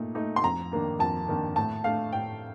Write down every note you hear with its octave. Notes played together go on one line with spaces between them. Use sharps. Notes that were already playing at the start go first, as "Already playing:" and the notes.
Already playing: A#2 A3 D#4
A3 D#4
C6
F2 A#5
D#3 A#3 D4
F2 A5
D#3 A#3 D4
A2 A5
A3 D4 F5
A2 G5